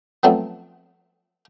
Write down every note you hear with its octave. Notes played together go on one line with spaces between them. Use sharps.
F3 F#3 A3 B3 C4